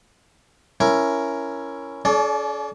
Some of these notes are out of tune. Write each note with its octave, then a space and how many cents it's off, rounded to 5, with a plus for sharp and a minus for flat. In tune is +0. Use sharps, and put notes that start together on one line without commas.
C#4 +0 E4 +15 A#4 +0
C#4 +40 A4 -45 D5 +0